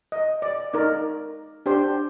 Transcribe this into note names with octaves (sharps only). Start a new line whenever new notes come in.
D#5
D5
D#4 A#4 D5
D4 G4 C5